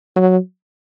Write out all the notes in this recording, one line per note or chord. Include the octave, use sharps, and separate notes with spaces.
F#3